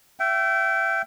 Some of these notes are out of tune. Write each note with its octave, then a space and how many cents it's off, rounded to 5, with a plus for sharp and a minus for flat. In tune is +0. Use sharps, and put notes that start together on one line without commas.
E5 +25 G5 -25